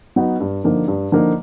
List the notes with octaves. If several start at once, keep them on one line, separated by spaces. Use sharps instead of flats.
F#3 B3 D#4 F#4
G2
D3 F3 A#3 D#4
G2
D3 F3 A#3 D#4